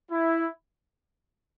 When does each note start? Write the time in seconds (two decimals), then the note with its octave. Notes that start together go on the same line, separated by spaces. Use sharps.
0.10 E4